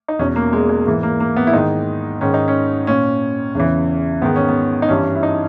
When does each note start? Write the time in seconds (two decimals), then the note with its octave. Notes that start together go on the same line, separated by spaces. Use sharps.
0.08 D#4
0.19 E2 B2 C#4
0.36 A#3
0.53 G#3
0.69 G#3
0.86 G#2 E3 A#3
1.03 A#3
1.20 A#3
1.37 B3
1.47 E4
1.53 G#2 D#3 D#4
2.21 G#2 D#3 C#4
2.34 D#4
2.48 C#4
2.87 A#2 C#4
3.55 E2 C#3 E3
4.22 G#2 D#3 B3
4.36 C#4
4.49 B3
4.82 D#4
4.89 G2 E3 C#4
5.15 E4
5.23 D#4